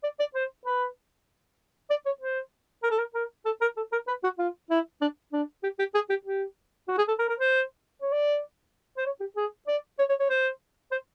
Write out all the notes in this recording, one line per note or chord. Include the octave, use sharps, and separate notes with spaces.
D5
D5
C5
B4
D5
C#5
C5
A#4
A4
A#4
A#4
A4
A#4
A4
A#4
B4
F#4
F4
E4
D4
D4
G4
G4
G#4
G4
G4
F#4
G#4
A4
A#4
A#4
C5
C#5
D5
C5
C#5
G4
G#4
D5
C#5
C#5
C#5
C5
C5